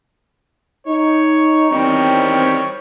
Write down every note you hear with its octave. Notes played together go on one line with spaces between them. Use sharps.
D#4 C#5
E2 D#3 G3 C4 C#5